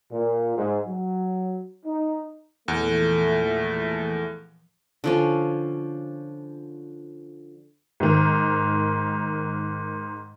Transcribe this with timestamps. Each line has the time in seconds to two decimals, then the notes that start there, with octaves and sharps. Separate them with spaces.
0.11 A#2
0.57 G#2
0.86 F#3
1.86 D#4
2.68 E2 A#2 E3 F3 A3
5.04 D3 F3 C#4
8.00 G#2 D#3